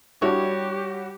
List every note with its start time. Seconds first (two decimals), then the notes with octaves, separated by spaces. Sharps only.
0.22 G3 D4 E4 F#4 G4 C#5